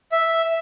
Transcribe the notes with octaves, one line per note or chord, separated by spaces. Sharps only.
E5